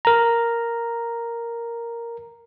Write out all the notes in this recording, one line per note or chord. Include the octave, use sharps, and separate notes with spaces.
A#4 A#5